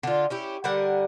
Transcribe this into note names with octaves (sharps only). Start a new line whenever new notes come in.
D3 F4
C#4 E4 G4
D3 G3 A#4 F#5